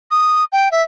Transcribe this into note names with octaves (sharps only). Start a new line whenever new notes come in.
D#6
G5
E5